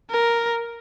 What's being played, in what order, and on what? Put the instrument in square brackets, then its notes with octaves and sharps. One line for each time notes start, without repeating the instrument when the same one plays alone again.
[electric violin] A#4